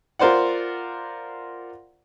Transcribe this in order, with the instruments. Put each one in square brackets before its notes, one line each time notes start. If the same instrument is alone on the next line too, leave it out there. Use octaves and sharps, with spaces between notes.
[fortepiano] F4 A#4 C5 D5 F#5